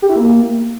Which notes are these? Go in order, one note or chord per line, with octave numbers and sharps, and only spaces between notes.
G4
E4
A#3